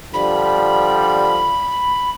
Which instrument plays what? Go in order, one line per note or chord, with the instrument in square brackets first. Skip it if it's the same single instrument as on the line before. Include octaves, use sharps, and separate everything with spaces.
[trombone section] D3 F3 G3 [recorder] B5